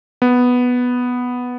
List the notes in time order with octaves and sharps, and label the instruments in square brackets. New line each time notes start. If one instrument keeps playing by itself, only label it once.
[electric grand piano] B3